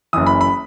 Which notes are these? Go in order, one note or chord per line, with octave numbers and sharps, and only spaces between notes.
F#1 F#2 E3 D#6
B5
B5